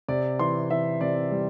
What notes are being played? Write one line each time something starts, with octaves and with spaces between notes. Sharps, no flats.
C3 D5
E3 C6
E3 E5
C3 D5
G3